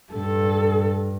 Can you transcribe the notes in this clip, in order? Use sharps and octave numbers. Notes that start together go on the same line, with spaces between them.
G2 A4